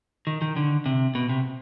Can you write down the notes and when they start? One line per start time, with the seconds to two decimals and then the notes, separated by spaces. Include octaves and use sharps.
0.27 D#3
0.42 D#3
0.56 D3
0.86 C3
1.15 B2
1.29 C3